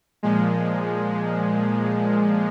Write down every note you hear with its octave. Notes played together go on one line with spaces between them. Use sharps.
A#2 F3 G#3